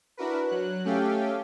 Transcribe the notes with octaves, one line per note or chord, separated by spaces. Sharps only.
D4 E4 F#4 A#4 B4
F#3 F#6
A3 C#4 G4 A4 F5 G5